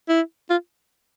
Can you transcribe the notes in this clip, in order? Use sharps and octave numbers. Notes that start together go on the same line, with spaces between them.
E4
F4